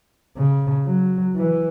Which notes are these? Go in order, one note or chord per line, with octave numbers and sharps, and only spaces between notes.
C#3
F#3
E3